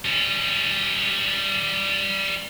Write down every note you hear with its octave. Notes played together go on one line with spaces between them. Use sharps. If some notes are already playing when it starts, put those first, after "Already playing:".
G3 C#4